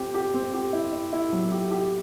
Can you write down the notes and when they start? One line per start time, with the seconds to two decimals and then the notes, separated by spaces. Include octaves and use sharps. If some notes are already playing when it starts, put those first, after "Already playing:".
Already playing: C4 G4
0.14 G4
0.34 C4
0.54 G4
0.73 E4
0.93 E4
1.13 E4
1.32 F#3
1.51 G4
1.71 G4